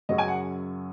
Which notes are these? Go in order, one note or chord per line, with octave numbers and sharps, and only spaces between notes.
F#2 C#3 F#3 C#4 D#5
G#5
F#5